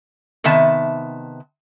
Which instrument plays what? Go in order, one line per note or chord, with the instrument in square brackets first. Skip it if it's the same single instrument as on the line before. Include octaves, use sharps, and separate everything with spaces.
[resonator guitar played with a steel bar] C3 D#3 B3 E5 A5